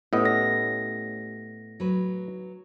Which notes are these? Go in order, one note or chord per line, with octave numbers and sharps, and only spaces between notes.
A2 B3 C#4 G4 D#5
A#6
F#3 B4